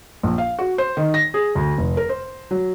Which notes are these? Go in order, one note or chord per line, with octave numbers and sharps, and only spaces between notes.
A#1
F5
F#4
C5
D#3
A#6
G#4
D2
F1
A#4
C5
F#3